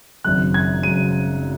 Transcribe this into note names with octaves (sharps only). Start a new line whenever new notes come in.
G#1 F#2 C#3 F#6
G#6
F#2 C#3 D#7